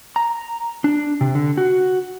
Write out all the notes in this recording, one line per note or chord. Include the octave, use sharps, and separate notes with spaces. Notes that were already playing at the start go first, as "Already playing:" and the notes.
A#5
D4
C3
D3
F#4